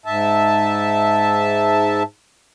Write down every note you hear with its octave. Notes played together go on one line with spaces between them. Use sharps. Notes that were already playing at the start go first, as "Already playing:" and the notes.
G#2 E5 A5